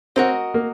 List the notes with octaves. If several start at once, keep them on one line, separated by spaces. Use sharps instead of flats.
C4 F#4 A#4 D#5
A#3